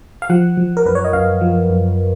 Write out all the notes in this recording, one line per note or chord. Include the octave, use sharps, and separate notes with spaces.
F5
F3 F#5
F3
A#4
F#2 B4
C#5
D#5
F#2 F5
F3
F#2